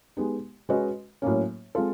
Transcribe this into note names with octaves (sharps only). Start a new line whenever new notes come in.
G#3 B3 D#4 G4
G#3 C#4 F#4 B4 D#5
A2 F#3 A#3 C#4
G#3 C4 F4 A4